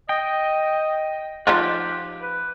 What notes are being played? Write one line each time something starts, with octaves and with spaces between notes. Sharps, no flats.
D#5 G5
F3 D#4 F4 G4 F#6
B4